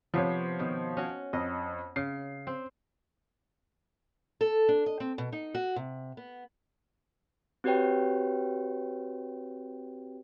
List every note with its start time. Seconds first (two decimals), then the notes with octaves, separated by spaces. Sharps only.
0.14 C3 F3 B3 C5 C#5
0.59 B2 D#3
0.97 C#4 F#4
1.33 F2 D#5
1.96 C#3 C7
2.47 C4
4.41 A4
4.69 D4
4.86 D#5
5.00 C4
5.18 B2
5.32 D#4
5.55 F#4
5.76 C3
6.17 B3
7.64 C4 F#4 G4 B4 C#5 G5